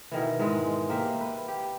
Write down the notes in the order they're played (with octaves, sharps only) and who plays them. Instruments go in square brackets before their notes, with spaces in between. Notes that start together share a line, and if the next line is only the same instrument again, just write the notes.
[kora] B2 D#3 E3
G#2 G#3
A#3 G4 E5
B4
G4